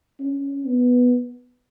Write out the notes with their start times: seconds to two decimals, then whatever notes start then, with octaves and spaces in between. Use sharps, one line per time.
0.20 C#4
0.65 B3